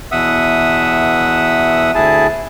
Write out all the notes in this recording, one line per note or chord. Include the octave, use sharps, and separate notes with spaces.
E2 B2 E5 F#5 D#6 E6
D2 E4 G#4 A5